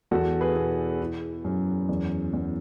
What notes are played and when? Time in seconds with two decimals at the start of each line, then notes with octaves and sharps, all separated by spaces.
0.11 E2 F#4 A4
0.41 G#4 B4
0.56 B2
1.00 E3
1.44 F#2
1.89 E2
2.33 E2